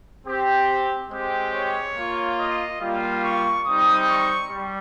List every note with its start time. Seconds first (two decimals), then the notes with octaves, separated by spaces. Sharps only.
0.26 C4 G4
1.11 G#3 C4 G4
1.54 C#5
1.96 A#3 F4
2.39 D#5
2.80 G3 A#3 F4
3.23 C#6
3.66 G3 C4 D#4 D#6
4.08 C#6
4.51 G3